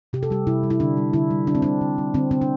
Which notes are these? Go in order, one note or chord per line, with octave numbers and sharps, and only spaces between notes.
C3 G4
A4
G3 G4
C3 E4
G3
E4
D3 D4
G3
D3 E4
G3
D3 D4
C4
G3 D4
D3
G3
D3 C4
D3 C4
D4